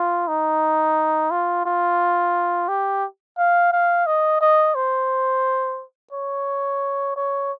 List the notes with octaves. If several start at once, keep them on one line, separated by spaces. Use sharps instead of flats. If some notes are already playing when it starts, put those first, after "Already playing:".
Already playing: F4
D#4
F4
F4
G4
F5
F5
D#5
D#5
C5
C#5
C#5